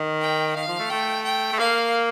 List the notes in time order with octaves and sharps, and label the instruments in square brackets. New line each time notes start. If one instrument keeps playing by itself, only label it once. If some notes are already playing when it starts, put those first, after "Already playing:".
Already playing: [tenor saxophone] D#3
[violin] G5
[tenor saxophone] D#3 [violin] F5
[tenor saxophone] F3
A3
[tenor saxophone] A3 [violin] G5
[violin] G5
[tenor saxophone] A3
[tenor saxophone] A#3 [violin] F5